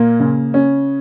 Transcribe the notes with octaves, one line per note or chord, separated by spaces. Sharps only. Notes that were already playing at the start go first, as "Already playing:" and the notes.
Already playing: A#2 A#3
C#3
C#4